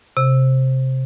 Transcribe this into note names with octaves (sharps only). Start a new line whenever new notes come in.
C3